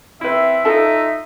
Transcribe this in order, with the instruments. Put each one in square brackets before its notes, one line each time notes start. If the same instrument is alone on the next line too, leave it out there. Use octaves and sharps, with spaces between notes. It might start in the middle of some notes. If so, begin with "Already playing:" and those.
[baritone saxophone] C4 [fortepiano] E4 B4 [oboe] E5
[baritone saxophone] D#4 [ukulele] F4 A4 A5